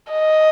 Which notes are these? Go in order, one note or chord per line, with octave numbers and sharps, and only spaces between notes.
D#5